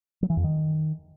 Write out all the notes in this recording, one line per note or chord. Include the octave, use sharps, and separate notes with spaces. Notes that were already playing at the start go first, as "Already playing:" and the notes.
F#3
E3
F2
D#3